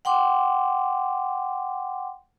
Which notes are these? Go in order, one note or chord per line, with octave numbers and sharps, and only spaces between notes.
F#5 G5 C6 D6